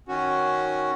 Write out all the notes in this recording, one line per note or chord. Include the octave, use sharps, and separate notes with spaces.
D#3 C#4 F#4